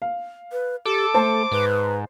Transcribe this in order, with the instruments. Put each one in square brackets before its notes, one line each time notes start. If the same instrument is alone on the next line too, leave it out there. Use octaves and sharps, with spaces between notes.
[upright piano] F5
[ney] B4
[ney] G4 [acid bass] A4 [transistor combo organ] D6
[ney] A3 [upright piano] C5 A5 C6
[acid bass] G#2 [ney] B4